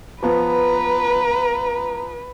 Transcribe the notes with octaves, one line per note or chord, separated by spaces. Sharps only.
F3 B3 B4 A#5